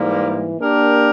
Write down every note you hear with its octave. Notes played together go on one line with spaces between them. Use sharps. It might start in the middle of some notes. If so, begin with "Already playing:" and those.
Already playing: G#2 E3 G3 A#3
A#3 D4 G4 A#4